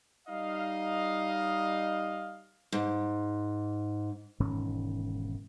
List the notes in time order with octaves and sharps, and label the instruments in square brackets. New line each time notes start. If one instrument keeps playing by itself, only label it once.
[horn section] G3 D#4 D#5 F5
[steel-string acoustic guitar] G#2
[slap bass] E1 G#2 D#3 C#4